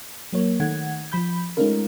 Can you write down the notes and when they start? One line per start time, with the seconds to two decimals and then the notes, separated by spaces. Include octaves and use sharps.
0.33 F#3 A#3 C#5
0.60 D#3 A3 F#5 G#6
1.12 F3 B5 G6
1.57 G#3 A3 C#4 D#4 F4 A#4